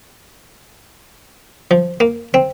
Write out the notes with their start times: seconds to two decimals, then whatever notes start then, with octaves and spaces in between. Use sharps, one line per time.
1.71 F3
2.00 A#3
2.34 C4